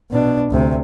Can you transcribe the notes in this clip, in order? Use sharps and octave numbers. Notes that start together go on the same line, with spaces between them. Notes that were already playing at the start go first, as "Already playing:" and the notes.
B2 D4
D2 C3